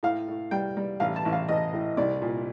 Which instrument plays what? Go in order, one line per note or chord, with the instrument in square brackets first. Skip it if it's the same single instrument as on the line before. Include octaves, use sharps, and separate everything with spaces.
[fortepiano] A2 F5
A2
G3 G5
G3
A1 F5
A5
A1
F5
A1 D#5
A2
C2 D5
A#2